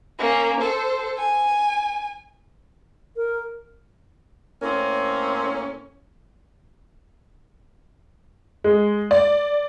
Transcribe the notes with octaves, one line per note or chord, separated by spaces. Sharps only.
A#3 C#4
A4 C5
G#5
A#4
A2 A#3 C4 C#4
G#3
D5